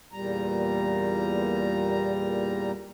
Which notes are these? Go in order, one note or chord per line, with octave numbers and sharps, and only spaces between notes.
E2 A#2 G3 A#5